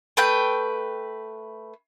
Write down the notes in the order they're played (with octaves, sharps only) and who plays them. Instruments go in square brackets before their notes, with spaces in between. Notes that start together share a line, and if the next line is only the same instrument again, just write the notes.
[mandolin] A3 B4 G5